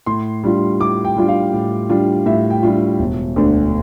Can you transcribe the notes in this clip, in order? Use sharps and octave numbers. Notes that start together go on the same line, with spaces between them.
A2 C6
G3 D4 F4
A2 D6
G5
G3 D4 F4
F5
A2
G3 D4 F4
A2 E5
G5
G3 D4 F4
E1
D2 D3 A3 D4